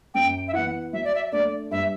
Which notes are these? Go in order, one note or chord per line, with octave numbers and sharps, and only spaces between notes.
F#2 G5
E5
E3 B3 F#5
F#3 E5
D5
E5
A3 D4 D5
G2 E5